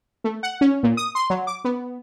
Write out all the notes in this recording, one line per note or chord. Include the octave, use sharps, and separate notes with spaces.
A3
F#5
C#4
A#2
D#6
C6
F#3
D6
B3